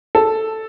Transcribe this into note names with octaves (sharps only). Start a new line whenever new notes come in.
A4